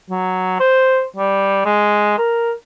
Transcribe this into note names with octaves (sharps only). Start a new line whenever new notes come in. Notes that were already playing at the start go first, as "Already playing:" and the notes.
F#3
C5
G3
G#3
A#4